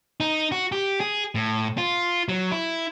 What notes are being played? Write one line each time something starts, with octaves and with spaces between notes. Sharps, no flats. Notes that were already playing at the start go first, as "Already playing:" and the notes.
D#4
F#4
G4
G#4
A2
F4
F#3
E4